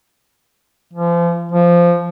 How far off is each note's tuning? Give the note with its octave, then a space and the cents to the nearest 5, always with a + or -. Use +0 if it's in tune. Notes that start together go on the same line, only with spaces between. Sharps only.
F3 -35
F3 -10